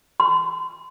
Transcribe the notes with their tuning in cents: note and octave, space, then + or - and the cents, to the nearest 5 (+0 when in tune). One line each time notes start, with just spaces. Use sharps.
C6 -35